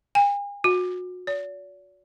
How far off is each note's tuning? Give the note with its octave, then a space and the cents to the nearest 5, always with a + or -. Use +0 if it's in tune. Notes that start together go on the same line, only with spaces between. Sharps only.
G#5 -45
F#4 -35
D5 -45